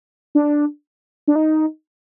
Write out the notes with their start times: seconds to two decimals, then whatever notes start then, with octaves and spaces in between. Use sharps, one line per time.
0.35 D4
1.28 D4
1.36 D#4